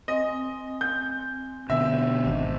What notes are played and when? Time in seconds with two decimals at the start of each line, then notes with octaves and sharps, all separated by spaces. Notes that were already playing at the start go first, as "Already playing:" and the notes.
0.08 C4 D#5 G#5 C6
0.81 G6
1.70 B2 D3 E5
2.26 G#1 D4 D#5